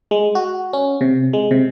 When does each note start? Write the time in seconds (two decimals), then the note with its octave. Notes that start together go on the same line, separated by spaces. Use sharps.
0.11 G#3
0.35 F#4
0.73 C#4
1.01 C3
1.33 G#3
1.51 C3